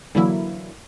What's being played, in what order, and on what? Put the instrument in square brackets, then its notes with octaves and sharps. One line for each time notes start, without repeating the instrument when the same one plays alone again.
[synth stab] D3 E3 F#3 A#3 E4